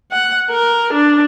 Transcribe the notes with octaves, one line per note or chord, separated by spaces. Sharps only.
F#5
A#4
D4